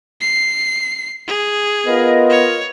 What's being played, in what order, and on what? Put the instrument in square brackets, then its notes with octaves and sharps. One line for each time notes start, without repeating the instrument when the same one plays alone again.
[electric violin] C7
G#4
[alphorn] B3 [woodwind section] F4 A#4 D#5
[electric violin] C#5